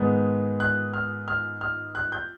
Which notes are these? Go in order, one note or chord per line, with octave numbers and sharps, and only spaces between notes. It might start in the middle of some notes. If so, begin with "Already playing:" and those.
Already playing: G#2 D#3 G#3 B3
F#6
F6
F6
F6
F#6
G6